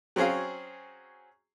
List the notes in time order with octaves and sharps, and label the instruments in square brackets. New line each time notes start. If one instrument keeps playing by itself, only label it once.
[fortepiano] F#3 C4 C#4 G#4 F5